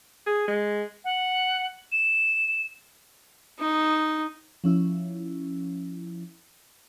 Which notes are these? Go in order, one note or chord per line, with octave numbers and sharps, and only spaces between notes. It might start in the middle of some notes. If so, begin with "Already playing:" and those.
G#4
G#3
F#5
E7
D#4
F3 C#4 E4